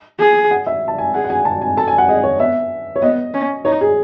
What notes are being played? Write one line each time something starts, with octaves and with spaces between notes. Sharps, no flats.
G#4
F#5
E5
A5
G#5
G#4 F#5
F#5
G#5
A5
G#5
A4 A5
G#5
F#5
G#4 D#5
C#5
B3 E5
C#5
B3 D#5
C#4
D#4 C#5
G#4